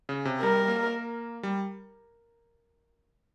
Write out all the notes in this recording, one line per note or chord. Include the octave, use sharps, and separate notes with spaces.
C#3
C3
G3 A#4
A#3
G3